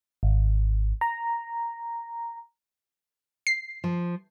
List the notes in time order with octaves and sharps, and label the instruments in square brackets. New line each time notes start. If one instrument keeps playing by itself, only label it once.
[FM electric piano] G#1
A#5
[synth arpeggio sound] C7
[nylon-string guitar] F3